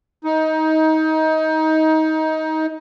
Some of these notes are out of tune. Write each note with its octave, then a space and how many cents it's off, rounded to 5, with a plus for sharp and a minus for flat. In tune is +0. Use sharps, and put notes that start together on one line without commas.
D#4 +20